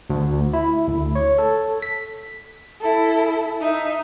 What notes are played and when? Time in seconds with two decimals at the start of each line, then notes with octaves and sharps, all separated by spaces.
0.10 D2
0.53 E4
0.88 D2
1.15 C#5
1.38 A4
1.82 B6
2.81 E4 A4
3.60 D#4 E5